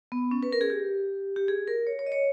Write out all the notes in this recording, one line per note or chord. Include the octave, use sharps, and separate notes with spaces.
B3
C#4
B4
A#4
G#4
G4
G4
G#4
A#4
C#5
C#5
D#5
C#5